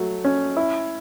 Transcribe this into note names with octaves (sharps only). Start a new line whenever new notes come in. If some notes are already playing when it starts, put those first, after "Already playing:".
Already playing: F#3 A3
C#4
E4